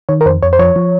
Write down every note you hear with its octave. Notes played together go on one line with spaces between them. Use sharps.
D#3 C#5
A#4
F2 C5
F2 C#5
C5
F3 C#5
F3